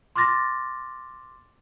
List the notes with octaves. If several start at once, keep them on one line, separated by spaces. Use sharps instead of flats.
C6 D6 F6 A6 A#6